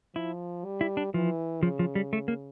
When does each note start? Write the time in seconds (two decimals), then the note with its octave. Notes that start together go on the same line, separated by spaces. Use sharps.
0.15 F3 E4
0.65 G3
0.81 E4
0.97 D4
1.14 E3 F3
1.63 C#3 F3
1.79 F3
1.95 G3
2.13 A3
2.28 A#3